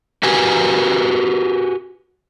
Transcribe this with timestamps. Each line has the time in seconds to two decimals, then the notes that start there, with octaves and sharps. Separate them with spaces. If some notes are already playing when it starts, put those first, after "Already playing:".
0.23 F#4 G4 A#4 B4 G#5